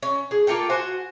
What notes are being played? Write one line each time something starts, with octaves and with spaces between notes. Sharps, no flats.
C#4
G#4
A#3 F4 A4 G5
F#4 C5 G#5